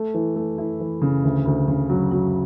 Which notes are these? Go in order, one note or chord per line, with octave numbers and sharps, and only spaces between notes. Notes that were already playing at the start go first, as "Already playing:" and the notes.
Already playing: A3
E3
A3
E4
E3
C#3
D2
D2
C#3
F#3
F#3